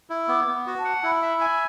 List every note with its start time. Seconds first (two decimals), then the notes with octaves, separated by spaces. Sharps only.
0.10 E4
0.28 B3 D6
0.48 B3
0.67 F#4
0.79 A5
0.84 F#5
1.03 E4 B5
1.22 E5
1.41 G#5